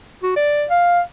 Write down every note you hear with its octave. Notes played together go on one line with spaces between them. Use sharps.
F#4
D5
F5